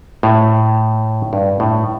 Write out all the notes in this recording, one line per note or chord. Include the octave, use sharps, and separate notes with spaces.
A2
G2
A2